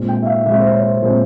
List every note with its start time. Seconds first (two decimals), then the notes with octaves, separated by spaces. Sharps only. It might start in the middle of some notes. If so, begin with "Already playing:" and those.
Already playing: A#2 G#3 C4
0.08 G5
0.22 E5
0.26 F5
0.45 A#2 E5
0.48 G#3 C4
0.60 C5
0.74 C#5
0.88 C5
1.02 A#2 G#3 C4 C5